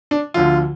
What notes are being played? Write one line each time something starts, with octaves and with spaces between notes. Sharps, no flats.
D4
D2 D3 F3 F4